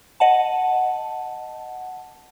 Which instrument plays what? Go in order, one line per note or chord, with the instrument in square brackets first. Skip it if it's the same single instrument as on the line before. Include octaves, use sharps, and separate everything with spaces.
[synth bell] D#5 F#5 A5